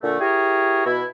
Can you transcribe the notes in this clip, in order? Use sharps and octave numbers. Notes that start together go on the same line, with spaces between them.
A#2 D3 A3
E4 G4 G#4 A#4 C#5
B2 E4